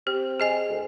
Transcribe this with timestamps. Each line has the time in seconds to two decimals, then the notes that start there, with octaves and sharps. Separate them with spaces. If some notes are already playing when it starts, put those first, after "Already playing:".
0.07 C4 G4
0.40 G#4 D#5 G#5
0.69 D2